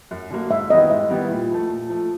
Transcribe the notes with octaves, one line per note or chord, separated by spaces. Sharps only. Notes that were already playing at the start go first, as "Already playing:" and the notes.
F#2
D3 F#3 A#3
G#2 E5
D#3 G3 B3 E4 D#5
G#2 E5
D#3 G3 B3 E4
A#2
F3 A3
A#2
F3 A3